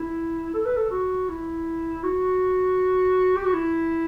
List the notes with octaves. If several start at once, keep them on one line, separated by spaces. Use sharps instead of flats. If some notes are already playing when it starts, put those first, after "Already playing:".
Already playing: E4
A4
B4
A4
F#4
E4
F#4
G4
F#4
E4